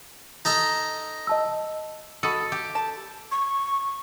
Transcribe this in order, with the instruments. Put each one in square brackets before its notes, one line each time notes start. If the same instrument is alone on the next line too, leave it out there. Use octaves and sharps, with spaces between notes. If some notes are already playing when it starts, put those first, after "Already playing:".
[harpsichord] D#4 A4 A#5
[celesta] D#5 A5 E6
[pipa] F#4 D#5 B5 [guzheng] A4
[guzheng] G4
[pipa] A5
[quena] C#6